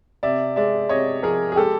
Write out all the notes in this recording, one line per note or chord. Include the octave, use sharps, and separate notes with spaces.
C3 D5 E5
G#3 D5 E5
C3 C#5 D#5
F3 G#4 A#4
G#4
G#3 G4 A4